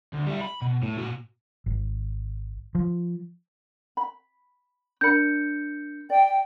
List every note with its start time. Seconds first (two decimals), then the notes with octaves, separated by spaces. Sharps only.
0.13 D2
0.27 G3 E4
0.41 B5
0.62 B2
0.83 A2
0.97 A#2 F#4
1.66 G#1
2.75 F3
3.97 B5
5.01 D4 A#4 B5 G6 C#7
6.10 D5 G5